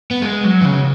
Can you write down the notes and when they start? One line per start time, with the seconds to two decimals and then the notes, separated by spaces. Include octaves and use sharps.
0.11 B3
0.22 G#3
0.44 F#3
0.62 E3
0.65 C#3